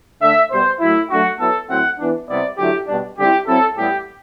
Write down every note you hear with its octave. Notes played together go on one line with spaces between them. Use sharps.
D3 A3 D4 E5
B2 G3 B3 C5
A2 F#3 A3 E4
F#3 A3 D4 F#4
F#3 B3 E4 A4
A2 F#3 C4 E4 F#5
E3 B3 D4
C3 G3 B3 E4 D5
D3 F#3 A3 E4 G4
B2 G3 D4
D3 G3 C4 E4 G4
F#3 C4 E4 A4
A2 G3 B3 E4 G4